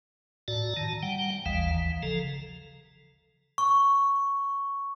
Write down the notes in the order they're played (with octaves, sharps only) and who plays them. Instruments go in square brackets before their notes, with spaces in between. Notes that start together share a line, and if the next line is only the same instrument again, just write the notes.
[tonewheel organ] A2 F#4 D5 A5 A#5
D#3 A5 A#5
G3 F#5 G5
G#1 D#2 E3 F5
E3
C#3 F3 A4 A#5
[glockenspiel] C#6